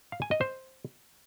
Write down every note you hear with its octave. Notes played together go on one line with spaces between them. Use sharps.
F5
G#5
D#5
C5